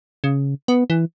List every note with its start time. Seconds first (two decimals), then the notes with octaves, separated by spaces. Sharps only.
0.24 C#3
0.68 B3
0.90 E3